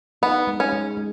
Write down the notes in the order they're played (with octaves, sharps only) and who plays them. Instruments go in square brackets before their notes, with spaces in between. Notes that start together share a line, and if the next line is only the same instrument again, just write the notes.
[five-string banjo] B3 [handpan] D#4
[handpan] G#3
[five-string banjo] C#4
[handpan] G#3
G#3